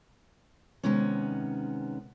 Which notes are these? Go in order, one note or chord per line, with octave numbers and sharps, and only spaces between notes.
C3 D#3 G#3 B3 C#4